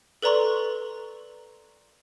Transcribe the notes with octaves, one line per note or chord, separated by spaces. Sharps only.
A4 B4 D5 A#5 C6 C#6